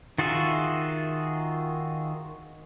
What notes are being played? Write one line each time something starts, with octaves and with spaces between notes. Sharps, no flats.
D#3 F4 F#4 G#4 E5